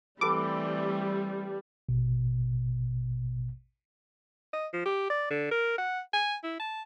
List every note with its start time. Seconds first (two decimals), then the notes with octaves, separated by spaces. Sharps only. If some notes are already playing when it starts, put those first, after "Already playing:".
0.21 E3 G3 A3 C4 G4 A4 B4 D6
1.89 A1 B2
4.53 D#5
4.74 F3
4.86 G4
5.10 D5
5.31 D3
5.51 A#4
5.78 F#5
6.13 G#5
6.44 E4
6.60 A5